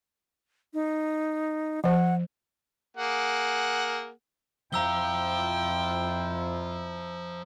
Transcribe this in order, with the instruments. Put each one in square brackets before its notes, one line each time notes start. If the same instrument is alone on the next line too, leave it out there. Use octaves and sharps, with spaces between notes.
[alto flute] D#4
[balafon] F3 C5 [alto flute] F#5
[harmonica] A#3 G#4 F#5
[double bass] F2 E4 [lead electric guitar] F3 F5 [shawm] G5 [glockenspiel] A#5 E6 G7